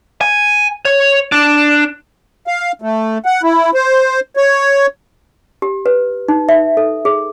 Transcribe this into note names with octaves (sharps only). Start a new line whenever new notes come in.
G#5
C#5
D4
F5
A3
F#5
E4
C5
C#5
G4
B4
D#4
E5
A4
G#4